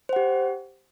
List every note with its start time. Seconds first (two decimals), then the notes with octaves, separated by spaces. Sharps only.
0.09 C5
0.13 F#5
0.16 G4